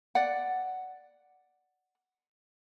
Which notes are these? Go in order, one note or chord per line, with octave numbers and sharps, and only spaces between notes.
D5 F#5